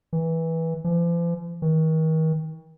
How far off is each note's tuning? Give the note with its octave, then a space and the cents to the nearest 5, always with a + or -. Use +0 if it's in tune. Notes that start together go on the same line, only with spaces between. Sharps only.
E3 -15
F3 -45
D#3 +40